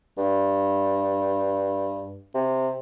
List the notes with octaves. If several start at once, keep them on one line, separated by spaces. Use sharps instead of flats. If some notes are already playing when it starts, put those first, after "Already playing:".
G2
C3